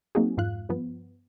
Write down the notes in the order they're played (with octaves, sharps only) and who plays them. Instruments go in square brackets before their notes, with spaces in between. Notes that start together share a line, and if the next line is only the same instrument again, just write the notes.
[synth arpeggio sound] F#3 A#3 C4 D#4 F#4 G#4
F2 G#2 F4 F5 F#6
G2 F3 B3